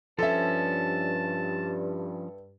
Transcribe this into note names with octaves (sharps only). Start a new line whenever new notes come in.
G2 F3 C#4 A4 E5 A5